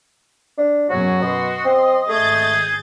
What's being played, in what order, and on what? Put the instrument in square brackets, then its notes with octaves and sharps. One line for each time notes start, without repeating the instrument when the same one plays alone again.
[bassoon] D4
[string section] F#2 B2 G#4 [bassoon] F#3 [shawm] F#4
[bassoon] B2 [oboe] D#5 [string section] C6
[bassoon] C4
[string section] G#1 G6 A6 [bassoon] A3 [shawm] G#4